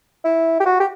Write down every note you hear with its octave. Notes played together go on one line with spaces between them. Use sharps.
E4
G4
F#4
G4